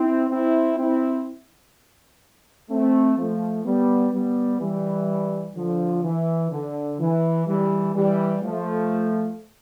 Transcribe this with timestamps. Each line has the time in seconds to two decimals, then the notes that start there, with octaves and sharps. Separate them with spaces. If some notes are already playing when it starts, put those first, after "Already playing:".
Already playing: C4 E4
0.30 C4 E4
0.78 C4 E4
2.70 A3 C4
3.17 F3 A3
3.64 G3 B3
4.12 G3 B3
4.61 E3 G3
5.55 D3 F3
6.04 E3
6.51 D3
7.00 E3
7.47 E3 G3
7.94 E3 G3
8.42 F3 A3